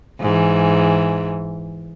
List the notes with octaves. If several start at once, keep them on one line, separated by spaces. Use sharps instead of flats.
G#2 E3